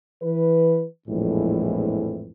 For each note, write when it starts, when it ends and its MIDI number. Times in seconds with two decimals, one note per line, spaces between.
0.22 0.85 52
0.22 0.85 71
1.08 2.32 34
1.08 2.32 41
1.08 2.32 45
1.08 2.32 52
1.08 2.32 56